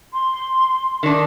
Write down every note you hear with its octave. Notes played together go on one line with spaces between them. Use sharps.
C6
D#3 D4